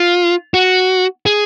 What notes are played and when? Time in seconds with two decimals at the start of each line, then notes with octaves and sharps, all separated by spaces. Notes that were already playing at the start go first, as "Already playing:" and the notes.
Already playing: F4
0.54 F#4
1.26 G#4